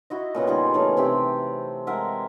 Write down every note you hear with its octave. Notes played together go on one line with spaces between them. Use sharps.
E4 F#4 D#5
A#2 C#3 B3
G3 D#4 F4 G#4
C#3 E3 A3 C#4
C3 C4 G4
G#3 A#4 E5 F#5